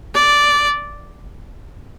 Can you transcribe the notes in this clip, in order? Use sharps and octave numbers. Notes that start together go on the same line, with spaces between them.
D5